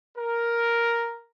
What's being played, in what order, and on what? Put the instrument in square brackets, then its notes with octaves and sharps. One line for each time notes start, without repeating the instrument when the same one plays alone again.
[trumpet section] A#4